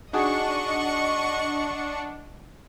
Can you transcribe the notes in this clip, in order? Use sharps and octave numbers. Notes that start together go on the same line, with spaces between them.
D4 D#4 F#4 G#4 D#5 F#5 C#6